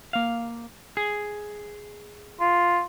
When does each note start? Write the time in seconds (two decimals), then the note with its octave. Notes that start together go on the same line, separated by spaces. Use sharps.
0.13 A#3 F5
0.97 G#4
2.40 F4